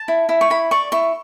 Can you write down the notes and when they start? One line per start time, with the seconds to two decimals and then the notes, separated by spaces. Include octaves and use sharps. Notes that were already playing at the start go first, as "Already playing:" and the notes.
Already playing: A5
0.08 E4
0.29 E4
0.41 C#6
0.50 E4 B5
0.71 D5 C#6
0.92 E4 C#6